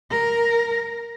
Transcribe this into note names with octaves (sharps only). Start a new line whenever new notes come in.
A#4